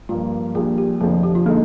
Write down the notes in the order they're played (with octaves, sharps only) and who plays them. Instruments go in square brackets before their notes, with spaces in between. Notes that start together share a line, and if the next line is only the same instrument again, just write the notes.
[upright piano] G2 F3 A#3 [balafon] F4
[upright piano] A#1 A#2 G3 D4 [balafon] G#4
[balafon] G4
[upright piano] F1 F2 D3 F3 [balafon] G#4
[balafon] G4
F4
[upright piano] D3 G#3 D#4 [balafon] A#3